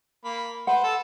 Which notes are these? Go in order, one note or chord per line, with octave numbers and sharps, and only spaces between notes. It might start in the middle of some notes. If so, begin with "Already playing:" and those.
A#3 B5
B4 C5 F#5
A4